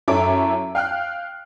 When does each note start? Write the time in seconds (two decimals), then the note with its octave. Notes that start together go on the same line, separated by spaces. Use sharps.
0.08 F#2 E4 A4 C#5 D6 D7
0.75 F5 G5 F6 F#6